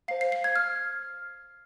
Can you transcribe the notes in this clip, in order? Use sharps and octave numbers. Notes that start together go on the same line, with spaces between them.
C5 F5 C7
C7
C7
G#6
F6